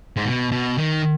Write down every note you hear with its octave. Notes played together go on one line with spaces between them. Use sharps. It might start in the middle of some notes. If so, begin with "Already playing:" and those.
G#2
B2
B2
D#3